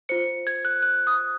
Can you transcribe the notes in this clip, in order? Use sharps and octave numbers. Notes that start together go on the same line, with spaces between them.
F4 C5 C#7
G#6
F#6
F#6
D#6